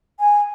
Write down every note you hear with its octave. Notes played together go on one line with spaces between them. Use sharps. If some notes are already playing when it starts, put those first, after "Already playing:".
G#5